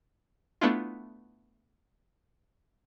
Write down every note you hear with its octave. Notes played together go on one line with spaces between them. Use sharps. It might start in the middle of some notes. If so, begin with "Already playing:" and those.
A3 B3 D4 E4 F4